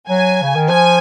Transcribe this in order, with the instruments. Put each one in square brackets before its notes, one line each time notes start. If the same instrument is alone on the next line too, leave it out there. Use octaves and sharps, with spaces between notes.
[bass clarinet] F#3 [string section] G#5
[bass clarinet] C#3
D#3
[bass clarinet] F3 [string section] G#5